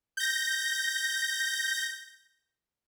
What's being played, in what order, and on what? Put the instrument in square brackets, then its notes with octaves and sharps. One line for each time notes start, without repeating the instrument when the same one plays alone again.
[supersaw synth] G6 A#6